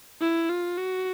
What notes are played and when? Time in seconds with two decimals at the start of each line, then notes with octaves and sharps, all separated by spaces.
0.21 E4
0.50 F4
0.78 F#4